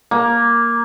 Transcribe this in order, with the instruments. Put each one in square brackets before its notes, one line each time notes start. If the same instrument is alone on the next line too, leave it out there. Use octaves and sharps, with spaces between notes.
[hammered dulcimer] A#3